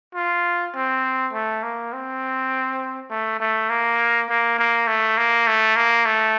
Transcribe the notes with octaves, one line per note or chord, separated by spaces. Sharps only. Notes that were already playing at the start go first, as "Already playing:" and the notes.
F4
C4
A3
A#3
C4
A3
A3
A#3
A#3
A#3
A3
A#3
A3
A#3
A3